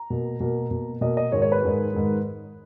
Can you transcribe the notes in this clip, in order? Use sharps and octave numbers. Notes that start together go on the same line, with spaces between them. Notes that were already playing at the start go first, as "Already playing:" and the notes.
Already playing: A#5
B2 A#3
B2 A#3
B2 A#3
B2 A#3 D#5
D#5
G#2 D#3 G#3 C#5
C#5
B4
G#2 D#3 G#3
G#2 D#3 G#3